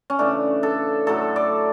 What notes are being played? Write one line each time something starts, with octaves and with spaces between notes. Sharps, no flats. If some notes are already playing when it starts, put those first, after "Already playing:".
C#4
C#3 E3 A3 D4
A4
A2 F#3 A3 A4
D5